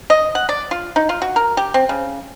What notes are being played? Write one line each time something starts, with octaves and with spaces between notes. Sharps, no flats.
D#5
F#5
D5
F4
D#4
F4
F#4
A#4
G4
C4
C#3